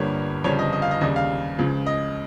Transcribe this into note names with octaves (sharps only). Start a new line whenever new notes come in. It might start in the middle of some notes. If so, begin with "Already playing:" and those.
Already playing: G1 G2 G3 A#3 C#5
G1 F2 C#3 G3 C#5
D#5
D#5
F5
D#5
D#2 C#3 G3 D#5
F5
C#2 C#3 F3
D#5